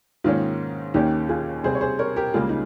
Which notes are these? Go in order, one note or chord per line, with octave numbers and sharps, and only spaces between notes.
G#2 D#3 A#3 C#4 F4
D#2 D#3 A#3 C#4 D#4 G4
F4 G#4
C3 G3 C4 G#4 C5
C#5
G#4 C5
A#4 C#5
G4 A#4
C#2 C#3 G3 A#3 F4 G#4
D#4